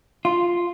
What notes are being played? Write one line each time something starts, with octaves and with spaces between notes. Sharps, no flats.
F4